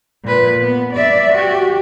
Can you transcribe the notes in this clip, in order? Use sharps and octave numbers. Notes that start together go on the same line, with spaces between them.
A#2 B4
B3
D5 E5
F#4 G4